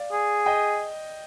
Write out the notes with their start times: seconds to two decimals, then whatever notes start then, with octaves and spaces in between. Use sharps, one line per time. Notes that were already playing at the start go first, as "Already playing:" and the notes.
Already playing: D5 F5
0.12 G#4
0.46 D#5 G5